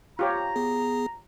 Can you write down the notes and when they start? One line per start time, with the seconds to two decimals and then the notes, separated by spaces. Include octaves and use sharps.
0.19 F4 G4 C#5 A#5
0.56 B3 G#4